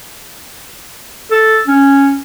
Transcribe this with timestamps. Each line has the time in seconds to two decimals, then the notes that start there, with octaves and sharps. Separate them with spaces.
1.31 A4
1.68 C#4